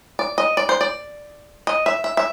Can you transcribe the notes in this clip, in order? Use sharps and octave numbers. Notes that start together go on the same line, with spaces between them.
D5
D#5
D5
C5
D5
D#5
E5
E5
E5